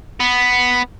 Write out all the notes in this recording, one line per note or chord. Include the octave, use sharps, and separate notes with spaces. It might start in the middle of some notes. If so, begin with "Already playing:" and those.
B3